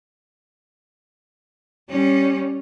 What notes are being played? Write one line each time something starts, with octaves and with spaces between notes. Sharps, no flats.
G3 C#4